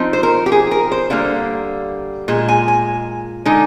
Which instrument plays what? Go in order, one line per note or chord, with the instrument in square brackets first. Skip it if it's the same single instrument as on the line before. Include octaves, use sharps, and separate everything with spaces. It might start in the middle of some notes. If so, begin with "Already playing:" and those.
Already playing: [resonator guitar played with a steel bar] F3 C4 D#4
C5
A#4
G4
G#4
A#4
C5
D3 G3 A#3 F5
A#2 G#3
G#5
G#5
D3 G#3 D#4